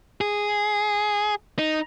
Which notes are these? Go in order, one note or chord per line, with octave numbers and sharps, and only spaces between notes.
G#4
D#4